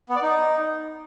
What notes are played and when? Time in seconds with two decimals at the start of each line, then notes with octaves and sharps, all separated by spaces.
0.09 B3
0.16 D5
0.22 D#4